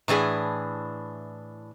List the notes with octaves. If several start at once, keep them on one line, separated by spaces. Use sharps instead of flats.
A2 E3 D4 G#4